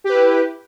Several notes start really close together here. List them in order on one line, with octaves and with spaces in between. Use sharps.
G4 B4 E4